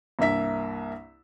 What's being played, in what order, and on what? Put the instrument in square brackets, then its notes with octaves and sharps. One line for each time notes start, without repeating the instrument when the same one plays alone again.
[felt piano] C2 G2 A#3 E5 B6